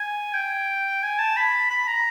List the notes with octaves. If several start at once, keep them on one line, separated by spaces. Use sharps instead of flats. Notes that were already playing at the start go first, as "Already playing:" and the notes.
Already playing: G#5
G5
G#5
A5
B5
B5
A#5